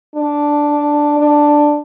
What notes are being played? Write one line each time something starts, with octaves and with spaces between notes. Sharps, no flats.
D4
D4